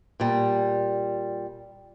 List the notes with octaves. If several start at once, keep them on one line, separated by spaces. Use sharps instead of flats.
A#2 G3